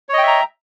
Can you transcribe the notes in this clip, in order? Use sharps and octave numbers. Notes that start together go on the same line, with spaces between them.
C#5 D#5 E5 G5 A#5